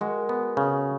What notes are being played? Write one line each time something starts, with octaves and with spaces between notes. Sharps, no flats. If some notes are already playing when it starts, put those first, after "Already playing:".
G#3 F#4 A#4
B3
C#3